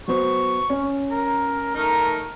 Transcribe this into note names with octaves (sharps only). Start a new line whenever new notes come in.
F#3 B3 C5 C#6
C#4
A#4
A3 D#4 A#4